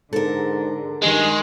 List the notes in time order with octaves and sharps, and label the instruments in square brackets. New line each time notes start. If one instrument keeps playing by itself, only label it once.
[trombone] G#2 [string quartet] D3 [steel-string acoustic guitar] A4 A#4
[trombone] G2 [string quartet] D#3 [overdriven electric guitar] G#3